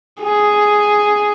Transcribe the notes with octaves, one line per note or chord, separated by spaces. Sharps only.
G#4